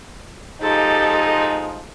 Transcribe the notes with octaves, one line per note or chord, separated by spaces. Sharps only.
F3 G#3 D#4 G4 A4